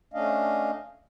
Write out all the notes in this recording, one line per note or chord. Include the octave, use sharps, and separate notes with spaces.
A3 C#4 D4 D#5 F5